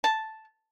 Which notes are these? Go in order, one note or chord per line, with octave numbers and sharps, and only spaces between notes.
A5